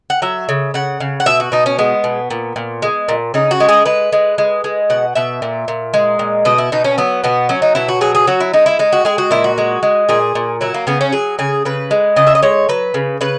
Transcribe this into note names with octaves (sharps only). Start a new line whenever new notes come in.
F#5
F#3 E5
C#3
C#3 F#5
C#3
F#5
B2 E5
F#4
B2 D#4
C#4
G#3 B3
B2
A#2
A#2
G#3
A#2
C#3 D#4
F#4
G#3
G#4
G#3 B4
G#3
G#3
G#3
B2 F#5
B2 E5
A#2
A#2
G#3
A#2
B2 D#5
E4
B2 D#4
C#4
F#3 B3
B2 B3
F#3 C#4
D#4
B2 E4
F#4
F#3 G#4
G#4
F#3 F#4
E4
G#3 D#4
E4
G#3 D#4
F#4
G#3 G#4
F#4
A#2 E4
F#4
G#3
G#3
A#2 G#4
A#2
F#3 E4
A#3
C#3 B3
C#4
F#3 G#4
C#3 G#4
C#3 B4
G#3
C#3 D#5
E5
D#5
G#3 C#5
F#3 B4
C#3
C#3 B4